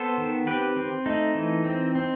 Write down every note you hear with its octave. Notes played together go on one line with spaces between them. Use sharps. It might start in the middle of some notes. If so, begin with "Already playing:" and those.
Already playing: B3 A4 C5
D#3
C4 G4 B4
C4
A3 D#4
E3
C4
C4